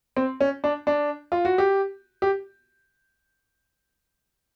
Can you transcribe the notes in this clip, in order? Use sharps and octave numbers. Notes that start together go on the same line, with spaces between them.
C4
C#4
D4
D4
F4
F#4
G4
G4